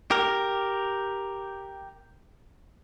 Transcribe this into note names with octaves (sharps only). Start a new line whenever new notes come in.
G4 A#4